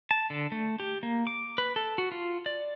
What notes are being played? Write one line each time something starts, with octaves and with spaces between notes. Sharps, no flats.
A5
D3
A3
G4
A#3
D6
B4
A4
F#4
F4
D5